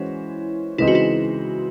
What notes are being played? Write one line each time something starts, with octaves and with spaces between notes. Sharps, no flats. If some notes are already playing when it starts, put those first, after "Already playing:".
Already playing: E3 G#3 C#4 E4 F#4 C5
C#3 E3 G#3 C4 D#4 E4
F#4
E4